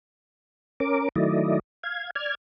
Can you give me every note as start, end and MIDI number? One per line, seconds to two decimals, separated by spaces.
0.80 1.09 61
0.80 1.09 70
0.80 1.09 86
1.16 1.59 51
1.16 1.59 54
1.16 1.59 57
1.16 1.59 64
1.16 1.59 74
1.16 1.59 75
1.83 2.11 77
1.83 2.11 92
2.15 2.35 74
2.15 2.35 89
2.15 2.35 92